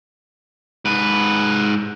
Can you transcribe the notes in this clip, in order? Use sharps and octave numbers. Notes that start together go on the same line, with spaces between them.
G#2 B4